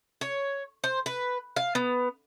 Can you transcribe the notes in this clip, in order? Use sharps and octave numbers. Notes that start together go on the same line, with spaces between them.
C#5
C5
B4
F5
B3